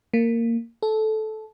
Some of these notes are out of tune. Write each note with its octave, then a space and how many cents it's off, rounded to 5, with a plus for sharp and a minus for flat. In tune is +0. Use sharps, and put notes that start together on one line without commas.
A#3 -15
A4 -15